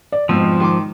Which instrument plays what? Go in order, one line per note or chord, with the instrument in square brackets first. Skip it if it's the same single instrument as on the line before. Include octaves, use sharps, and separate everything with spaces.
[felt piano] D5
[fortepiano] F2 B2 E6 [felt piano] G#2 [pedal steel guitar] F3
[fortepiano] D#3 C6 D6